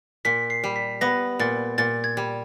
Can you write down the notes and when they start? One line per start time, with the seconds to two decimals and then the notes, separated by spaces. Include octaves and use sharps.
0.25 A#2 B6
0.50 C7
0.64 G3
0.76 B6
1.01 B3 A#6
1.39 A#2 A6
1.78 A#2 A6
2.04 G#6
2.17 G3